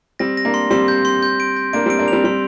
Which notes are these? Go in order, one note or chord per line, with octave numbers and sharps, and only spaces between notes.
G3 C4 A#6
A#6
A#3 D4
C6
G3 C4 C6
G6
C6
G6
D7
G6
A#3 D4 D7
G3 C4 D7
A#3 D4
G3 C4 F7
G3 C4 C6